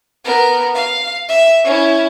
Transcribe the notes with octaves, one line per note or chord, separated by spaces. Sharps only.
B3 A#4
F5
E5
C#4 E4